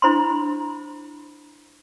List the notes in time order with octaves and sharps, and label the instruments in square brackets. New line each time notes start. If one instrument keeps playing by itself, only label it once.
[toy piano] D4 E4 C5 B5 C6